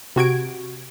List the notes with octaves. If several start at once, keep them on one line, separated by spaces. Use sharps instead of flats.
C3 F#4 G#6 D7